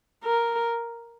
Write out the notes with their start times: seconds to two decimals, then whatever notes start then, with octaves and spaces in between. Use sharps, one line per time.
0.24 A#4